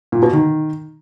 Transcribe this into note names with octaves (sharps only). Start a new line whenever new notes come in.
A#2
B2
D#3